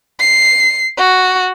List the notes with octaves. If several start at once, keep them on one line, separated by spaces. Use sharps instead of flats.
C7
F#4